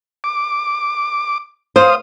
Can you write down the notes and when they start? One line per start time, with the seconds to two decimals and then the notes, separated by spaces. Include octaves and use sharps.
0.24 D6
1.76 C5 F5 D#6